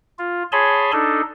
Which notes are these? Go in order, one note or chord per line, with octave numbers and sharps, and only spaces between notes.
F4
G#4 C#5 G#5 A5 B5 C6
D4 D#4 A4